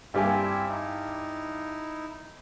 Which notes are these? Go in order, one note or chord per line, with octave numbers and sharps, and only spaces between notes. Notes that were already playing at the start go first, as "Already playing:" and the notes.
G2 C4 E4 G4 E5 G#5
D#4 E4